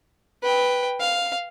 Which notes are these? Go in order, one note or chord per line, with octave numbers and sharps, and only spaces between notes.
B4 G5
F5